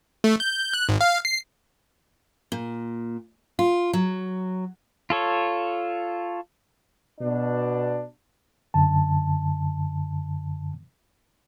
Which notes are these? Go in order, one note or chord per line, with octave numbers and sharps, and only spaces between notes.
A3
G6
F#6
G#1
F5
C7
A#2
F4
F#3
F4 A4 C#5
B2 D4
F#2 D3 A5